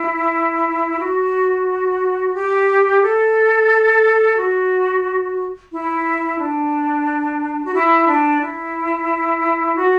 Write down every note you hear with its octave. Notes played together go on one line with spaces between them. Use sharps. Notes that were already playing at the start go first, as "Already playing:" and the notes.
Already playing: E4
F#4
G4
A4
F#4
E4
D4
F#4
E4
D4
E4
F#4